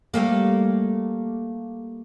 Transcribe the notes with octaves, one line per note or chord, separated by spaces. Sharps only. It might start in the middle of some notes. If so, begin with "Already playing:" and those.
G3 A3 A#3